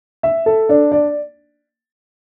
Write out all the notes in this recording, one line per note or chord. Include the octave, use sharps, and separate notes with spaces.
E5
A4
D4
D5